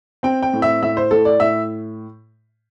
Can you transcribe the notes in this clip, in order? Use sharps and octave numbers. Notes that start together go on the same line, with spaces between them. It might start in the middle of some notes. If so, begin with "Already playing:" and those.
C4 G5
G5
A2
E5
A2 E5
C5
A2 A4
D5
A2 E5